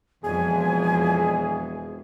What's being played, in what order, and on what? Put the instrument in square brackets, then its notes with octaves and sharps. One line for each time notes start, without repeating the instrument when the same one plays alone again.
[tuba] E1 [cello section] F2 [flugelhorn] G#4 [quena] G#5